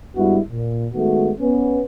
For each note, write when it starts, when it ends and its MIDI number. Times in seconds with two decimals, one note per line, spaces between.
0.16 0.38 43
0.16 0.38 55
0.16 0.38 56
0.16 0.38 59
0.16 0.38 64
0.16 0.38 66
0.51 0.88 46
0.94 1.31 51
0.94 1.31 56
0.94 1.31 57
0.94 1.31 59
0.94 1.31 66
1.41 1.82 59
1.41 1.82 61